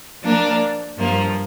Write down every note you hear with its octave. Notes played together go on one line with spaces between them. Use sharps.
F3 A#3 D4 A#4 D5
G2 F3 A#3